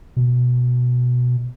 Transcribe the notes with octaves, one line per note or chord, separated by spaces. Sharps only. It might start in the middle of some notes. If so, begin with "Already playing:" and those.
B2